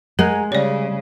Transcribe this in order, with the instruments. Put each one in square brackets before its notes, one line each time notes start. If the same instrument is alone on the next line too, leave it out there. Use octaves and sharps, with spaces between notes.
[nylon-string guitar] G#3 [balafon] A#4 [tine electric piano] F#5 G#5 A#5
[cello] C#3 [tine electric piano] G3 [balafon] C#5 D5